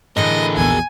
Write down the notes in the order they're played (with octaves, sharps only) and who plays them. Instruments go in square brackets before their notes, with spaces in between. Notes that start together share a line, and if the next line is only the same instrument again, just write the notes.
[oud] A2 D3 E3 [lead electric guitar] G#4 A#4 [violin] D#5
[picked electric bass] A#1 E2 B2 [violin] G#5